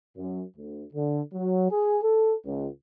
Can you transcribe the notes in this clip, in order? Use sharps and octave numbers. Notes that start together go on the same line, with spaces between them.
F#2
D2
D3
F#3
G#4
A4
C#2